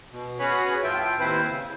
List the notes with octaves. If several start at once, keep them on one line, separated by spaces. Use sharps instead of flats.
B2
C#4 F#4 G#4 B4 C#5 B5
A2 F3 F4 E5 G5
D#2 D#3 C4 E4 B4 C5
C#3